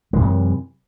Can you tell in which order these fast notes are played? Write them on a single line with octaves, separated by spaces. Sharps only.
G#3 E3 C3 F#2